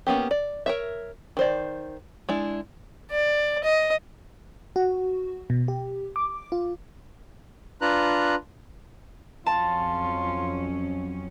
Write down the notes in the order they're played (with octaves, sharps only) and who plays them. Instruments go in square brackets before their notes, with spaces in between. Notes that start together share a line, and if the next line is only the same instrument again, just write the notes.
[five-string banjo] A#3 B3 C#4 G4
D5
A#4 C#5 E5
D#3 C5 D5
G#3 D4 E4
[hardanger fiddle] D5
D#5
[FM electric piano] F#4
B2
G4
D6
F4
[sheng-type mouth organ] D4 F4 B4 A#5 F#6
[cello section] F2 F#3 C#4 [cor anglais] F4 [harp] A5